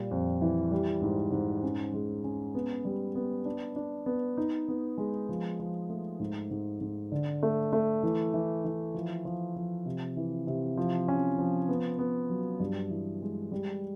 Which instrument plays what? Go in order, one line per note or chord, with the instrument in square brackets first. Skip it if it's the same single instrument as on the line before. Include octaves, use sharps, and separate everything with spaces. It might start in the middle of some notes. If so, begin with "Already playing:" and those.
Already playing: [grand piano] A#2 G3
F2
E3
G3
G#2
G#2
C#4
G#3
C#4
B3
G3
B3
D4
D4
B3
D#4
B3
G#3
F3
F3
A3
G#2
G#2
G#2
D3
A3
A3
E3
E3
E3
F3
F3
F3
C3
E3
C3
F3
C#4
F3
B3
B3
F#3
G2
E3
G#3
G3